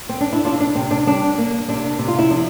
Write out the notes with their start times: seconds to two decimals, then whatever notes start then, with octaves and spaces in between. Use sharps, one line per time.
0.09 C4
0.21 D4
0.33 E4
0.45 C3 D4 F4
0.60 D4
0.75 C3 C4
0.91 D4
1.07 G3 D4
1.38 A#3
1.68 C3 D4
1.99 C3
2.08 F4
2.19 E4
2.30 F3 D4